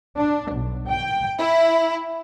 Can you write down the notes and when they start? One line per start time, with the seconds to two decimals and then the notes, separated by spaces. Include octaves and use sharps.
0.18 D4
0.53 B1
0.87 G5
1.39 E4